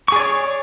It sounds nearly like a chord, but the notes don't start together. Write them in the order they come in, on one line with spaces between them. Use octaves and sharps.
C#6 G#4 D5 C#5